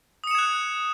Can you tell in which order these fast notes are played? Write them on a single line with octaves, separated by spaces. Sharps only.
D#6 C#7 E7 G#6 F#6